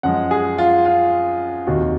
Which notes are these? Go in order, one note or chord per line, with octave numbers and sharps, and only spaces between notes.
F#2 F3 G#3 F#5
G#4
F4
F4
F1 D#2 D#3 F#4